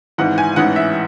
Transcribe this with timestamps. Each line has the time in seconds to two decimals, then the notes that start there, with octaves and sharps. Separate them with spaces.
0.18 G#1 G#2 E3 F#5
0.38 G#5
0.56 A1 G#2 E3 F#5
0.76 E5